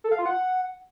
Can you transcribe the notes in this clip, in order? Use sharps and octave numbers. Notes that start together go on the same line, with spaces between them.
A4
F5
F4
F#5